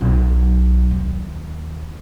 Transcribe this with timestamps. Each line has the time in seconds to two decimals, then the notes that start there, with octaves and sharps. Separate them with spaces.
0.01 B1
0.91 D#2